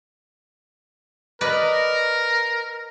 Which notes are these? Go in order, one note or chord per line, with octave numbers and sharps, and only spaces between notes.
A#4 B4 D5 D#5